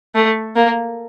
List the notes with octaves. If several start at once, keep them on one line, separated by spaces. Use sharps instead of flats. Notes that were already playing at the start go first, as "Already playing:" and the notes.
A3
A#3